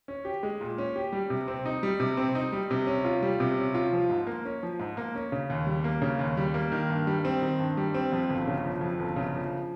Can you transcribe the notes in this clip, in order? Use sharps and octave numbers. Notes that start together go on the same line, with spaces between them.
C#4
G4
G#3
A#2
C#4
G4
G3
C3
C4
D#4
G3
C3
C4
D#4
G3
C3
C#4
F4
G3
C3
C#4
F4
F3
G#2
A#3
C#4
F3
G#2
A#3
C#4
C#3
D#2
G3
A#3
C#3
D#2
G3
A#3
D#3
G2
G3
C4
D#3
G2
G3
C4
F2
G1
C#3
F3
F2
G1
C#3
F3